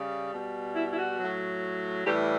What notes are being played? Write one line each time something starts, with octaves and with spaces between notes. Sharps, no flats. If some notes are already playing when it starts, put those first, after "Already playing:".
Already playing: C#3 G3
B2 G3
E4
E4
F#4
F#3
A2
A2 E3 G3 G4